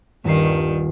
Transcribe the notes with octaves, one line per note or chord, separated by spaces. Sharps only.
D#1 G2 D#3 C7